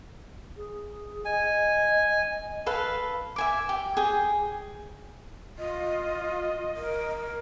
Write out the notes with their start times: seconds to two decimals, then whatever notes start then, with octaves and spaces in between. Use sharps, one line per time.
0.57 G#4
1.25 D#5 G#5
2.66 A4 B4 F5
3.36 E5 G#5 D6
3.69 G4
3.97 G#4 G5
5.58 F4 D#5
6.77 A#4